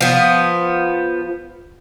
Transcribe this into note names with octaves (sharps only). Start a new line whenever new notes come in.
F3 B3